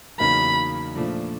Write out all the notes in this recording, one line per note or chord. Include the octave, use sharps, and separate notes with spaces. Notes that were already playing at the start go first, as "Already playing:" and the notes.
E2 C#3 F#3 A#3 D#4 B5
A#2 F3 A3 D4